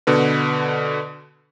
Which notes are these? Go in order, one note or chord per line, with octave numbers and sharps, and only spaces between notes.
B2 D3 B4